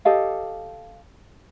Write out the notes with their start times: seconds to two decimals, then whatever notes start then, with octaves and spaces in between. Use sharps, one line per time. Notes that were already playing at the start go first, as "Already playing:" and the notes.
0.05 G4 A4 D#5 F5